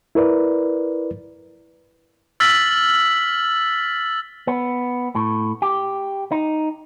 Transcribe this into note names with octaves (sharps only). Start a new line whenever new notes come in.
E4 A#4 B4 D5
E6 F6 A6 B6 F#7
B3
A2
G4
D#4